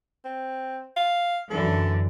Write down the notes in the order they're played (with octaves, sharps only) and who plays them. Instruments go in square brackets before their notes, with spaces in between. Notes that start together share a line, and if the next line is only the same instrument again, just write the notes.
[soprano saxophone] C4
F5
[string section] F#2 D3 E3 [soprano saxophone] A4